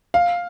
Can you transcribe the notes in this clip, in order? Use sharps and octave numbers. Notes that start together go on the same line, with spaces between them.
F5